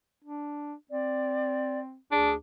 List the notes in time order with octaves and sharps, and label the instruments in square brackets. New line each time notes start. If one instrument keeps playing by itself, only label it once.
[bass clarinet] D4
[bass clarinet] C4 [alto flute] D5
[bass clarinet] D2 [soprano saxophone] D4 [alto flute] G#4